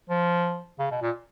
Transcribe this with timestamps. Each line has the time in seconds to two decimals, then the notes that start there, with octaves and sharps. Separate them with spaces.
0.10 F3
0.79 C#3
0.91 B2
1.02 A#2